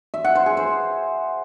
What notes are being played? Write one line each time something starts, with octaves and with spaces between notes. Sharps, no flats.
E5
F#5
C5
G#4
C5